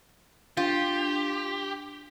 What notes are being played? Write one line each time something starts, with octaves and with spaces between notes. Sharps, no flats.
D4 F4 G4